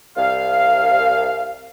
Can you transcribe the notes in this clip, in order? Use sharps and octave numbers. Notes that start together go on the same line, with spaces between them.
C2 F5